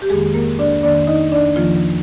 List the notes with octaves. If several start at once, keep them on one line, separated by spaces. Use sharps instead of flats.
G4
F2 D#3 G#3 A#3 G#4
A#3 A#4
D4 D5
F2 D#3 A#3 D4 D5
D#4 D#5
D4 D5
F2 D#3 F3 A#3 F4